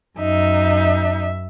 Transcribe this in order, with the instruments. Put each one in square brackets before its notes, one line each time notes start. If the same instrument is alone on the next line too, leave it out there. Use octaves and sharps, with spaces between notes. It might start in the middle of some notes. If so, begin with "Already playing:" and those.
[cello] F#2 E5 [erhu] D#4